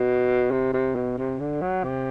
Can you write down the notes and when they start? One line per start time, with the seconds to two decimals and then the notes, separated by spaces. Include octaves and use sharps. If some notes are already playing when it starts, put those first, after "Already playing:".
Already playing: B2
0.51 C3
0.74 C3
0.95 B2
1.18 C3
1.39 D3
1.62 F#3
1.84 C3